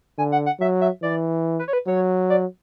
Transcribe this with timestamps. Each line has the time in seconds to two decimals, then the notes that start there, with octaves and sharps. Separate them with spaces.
0.18 D3 G#5
0.32 F#5
0.46 F#5
0.60 F#3 E5
0.81 E5
1.03 E3 D5
1.59 B4
1.68 C#5
1.73 B4
1.87 F#3 C#5
2.30 D5